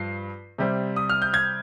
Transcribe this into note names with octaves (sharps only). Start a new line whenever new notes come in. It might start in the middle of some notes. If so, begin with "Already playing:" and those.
Already playing: G2 F3 C7
C3 G3 C4
D#6
F6
G6
G#6